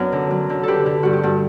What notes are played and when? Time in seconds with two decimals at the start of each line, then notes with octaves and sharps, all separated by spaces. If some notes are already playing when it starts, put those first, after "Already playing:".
Already playing: F#2 B3 D4
0.12 D3
0.31 F#3
0.50 D3
0.63 D3 G4 A4 B4
0.86 D3
1.03 G2 F#4
1.13 G4
1.23 G2 F#4 A4